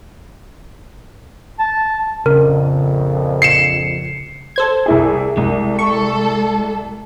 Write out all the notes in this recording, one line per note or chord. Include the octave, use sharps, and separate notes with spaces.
A5
A#1 F2 C#3 A#4
C7 C#7 E7
A4 C5 G#6
C2 E4 G#4
C2 G#3
A4 C#6